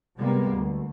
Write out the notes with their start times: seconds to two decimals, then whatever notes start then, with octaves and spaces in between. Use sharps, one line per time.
0.17 C3 G3 G#3 A#3 B3
0.52 D2